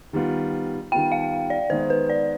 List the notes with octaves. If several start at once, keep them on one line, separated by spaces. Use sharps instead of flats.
D#3 G3 B3 F4
D#3 G3 B3 F4 G5
F5
D5
D#3 G#3 B3 C5
B4
D5